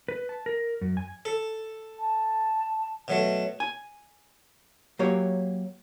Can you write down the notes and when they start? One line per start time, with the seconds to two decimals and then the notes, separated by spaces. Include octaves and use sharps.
0.08 B4
0.29 A5
0.46 A#4
0.81 F#2
0.97 G#5
1.25 A4
2.00 A5
3.08 B2 F#3 A3
3.60 G#5
4.99 F#3 A#3 G4 C#5